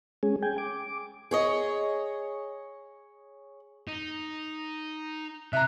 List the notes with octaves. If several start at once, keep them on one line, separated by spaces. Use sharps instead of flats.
G#3 C#4 G#4
G5 G#5
D6
G#4 C#5 D#5
D#4
C3 E5 A#5 F#6